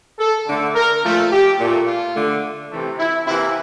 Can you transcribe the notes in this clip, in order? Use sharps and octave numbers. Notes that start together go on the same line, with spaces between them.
A4
D3 A3
A#4
A#2 F3 A3
G4
A#2
A3
F4
D3 A3
C3 E3 A3
E4
C3 E3 A#3 E4